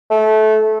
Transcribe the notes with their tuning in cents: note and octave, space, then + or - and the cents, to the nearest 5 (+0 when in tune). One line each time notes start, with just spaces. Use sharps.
A3 -20